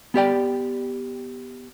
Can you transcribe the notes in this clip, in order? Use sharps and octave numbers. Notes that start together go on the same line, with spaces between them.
B3 G4 D5 G5